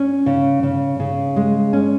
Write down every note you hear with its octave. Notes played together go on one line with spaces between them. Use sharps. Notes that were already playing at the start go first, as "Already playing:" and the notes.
Already playing: C#4
C#3
C#3
C#3
G#3
C#4